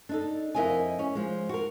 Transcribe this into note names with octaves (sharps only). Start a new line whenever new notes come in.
D4 D#4 A4
F2 E4 A#4 D#5 F5 G#5
C#4
F3 G#3
F#4 A#4